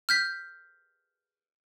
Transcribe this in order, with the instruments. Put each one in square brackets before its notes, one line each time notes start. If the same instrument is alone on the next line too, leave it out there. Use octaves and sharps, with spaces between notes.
[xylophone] F6 G6 B6